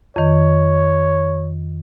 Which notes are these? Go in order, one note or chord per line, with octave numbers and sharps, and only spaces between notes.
F2 D#3 C#5